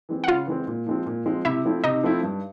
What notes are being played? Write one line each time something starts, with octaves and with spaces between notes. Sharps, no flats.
E3 G#3 C4
F#5
C#3 F4 F5
E3 G#3 C4
A#2
F3 G#3 C4
A#2
F3 G#3 C4
C3 E4 E5
F3 A3 C4 E4
C3 D#4 D#5
F3 A3 C4 E4
G2